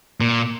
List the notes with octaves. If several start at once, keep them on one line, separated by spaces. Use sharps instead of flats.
A#2